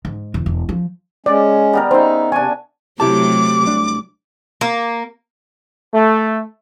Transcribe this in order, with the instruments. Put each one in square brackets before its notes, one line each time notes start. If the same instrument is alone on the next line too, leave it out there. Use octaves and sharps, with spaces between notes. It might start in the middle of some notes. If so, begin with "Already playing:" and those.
[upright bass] G#2
E1
E1
F3
[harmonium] G#3 C#4 [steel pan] D5
[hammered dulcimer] G3 B3 A#4
[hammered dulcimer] C#3 E5 [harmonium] D#4 [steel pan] C5
[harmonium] C3 [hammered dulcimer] D4 C#6 [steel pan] G#5
[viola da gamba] C3 F#3 A3 [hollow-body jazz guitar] E4 G4 A5 [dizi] D6
[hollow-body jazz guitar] C2 D4
[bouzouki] A#3
[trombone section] A3